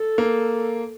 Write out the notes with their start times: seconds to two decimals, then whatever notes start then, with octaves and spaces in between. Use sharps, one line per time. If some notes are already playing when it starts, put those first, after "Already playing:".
Already playing: A4
0.18 A#3